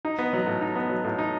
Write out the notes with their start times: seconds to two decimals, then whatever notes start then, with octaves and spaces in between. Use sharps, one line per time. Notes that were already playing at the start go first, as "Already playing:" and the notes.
0.05 D#4
0.19 B3
0.33 F#3
0.47 A2
0.61 D#4
0.75 B3
0.89 F#3
1.04 A2
1.18 D#4